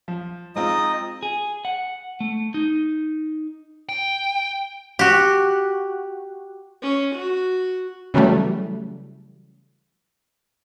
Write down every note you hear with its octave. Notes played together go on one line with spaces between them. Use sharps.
F3
G#3 C4 D#4 F4 D#5 D#6
G#4
F#5
A3
D#4
G5
F#4 G4
C#4
F#4
C#3 E3 F#3 G3 A3